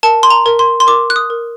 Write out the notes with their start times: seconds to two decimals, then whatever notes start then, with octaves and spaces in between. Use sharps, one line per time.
0.03 A#4 A5
0.23 C6
0.30 A#5
0.46 A#4
0.59 C6
0.80 C6
0.87 A#4 D6
1.10 F#6
1.16 D#6
1.30 A#4